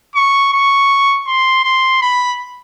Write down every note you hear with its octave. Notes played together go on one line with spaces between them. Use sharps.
C#6
C#6
C6
C6
B5